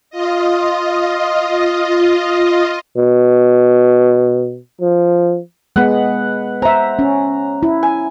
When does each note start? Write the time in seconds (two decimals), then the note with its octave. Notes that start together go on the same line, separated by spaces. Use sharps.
0.10 F4 D#5
2.97 B2
4.81 F3
5.76 G#3 B3 B4 F#5
6.62 C5 E5 A#5
6.99 C#4
7.63 E4
7.83 G#5